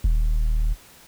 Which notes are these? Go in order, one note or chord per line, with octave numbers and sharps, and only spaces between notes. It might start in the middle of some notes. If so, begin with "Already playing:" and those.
D#1